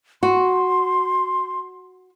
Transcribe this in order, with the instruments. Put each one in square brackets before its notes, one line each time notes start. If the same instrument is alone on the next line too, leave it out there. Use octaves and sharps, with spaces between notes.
[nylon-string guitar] F#4 [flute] C6